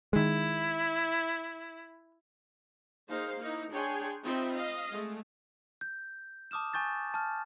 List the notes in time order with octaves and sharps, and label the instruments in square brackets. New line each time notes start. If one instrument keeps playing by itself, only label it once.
[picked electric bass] D#3 G#3 [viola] E4
[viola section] A#3 D#4 G#4 C5 F5
A#3 D#4 E4
D4 G#4 C#5 G5 G#5 C6
C4 D#4 F4 E5 G5 B5
D#5 F5
G#3 A3
[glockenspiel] G6
A5 D6 D#6 F6 E7
G#5 C#6 G6 A6
A5 F6